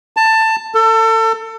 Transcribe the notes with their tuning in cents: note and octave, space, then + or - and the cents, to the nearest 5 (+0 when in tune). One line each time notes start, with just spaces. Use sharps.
A5 +15
A4 +30